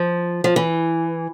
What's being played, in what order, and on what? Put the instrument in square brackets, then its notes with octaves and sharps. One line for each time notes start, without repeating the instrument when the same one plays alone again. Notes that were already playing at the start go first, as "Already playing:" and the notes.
Already playing: [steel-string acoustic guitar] F3
F3
E3